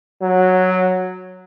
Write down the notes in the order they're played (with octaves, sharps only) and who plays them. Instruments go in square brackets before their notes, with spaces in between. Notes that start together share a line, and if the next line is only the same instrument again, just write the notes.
[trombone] F#3